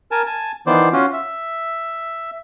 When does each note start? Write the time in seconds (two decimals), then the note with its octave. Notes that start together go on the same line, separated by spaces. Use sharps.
0.11 A#4 G#5 A5
0.26 G#5 A5
0.67 D#3 E3 B3 C5 D5
0.93 C#4 F4 F#4
1.13 E5